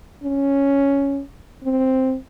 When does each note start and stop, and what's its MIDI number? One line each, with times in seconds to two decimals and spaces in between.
0.23 1.21 61
1.64 2.15 60